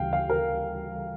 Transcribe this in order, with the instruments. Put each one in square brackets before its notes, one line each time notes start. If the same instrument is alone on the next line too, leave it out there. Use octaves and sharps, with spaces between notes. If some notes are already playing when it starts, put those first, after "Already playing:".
Already playing: [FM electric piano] D2 C#3 E3 G3 [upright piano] F5 G5
[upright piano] F5
A#4